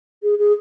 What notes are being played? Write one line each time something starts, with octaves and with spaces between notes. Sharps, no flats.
G#4
G#4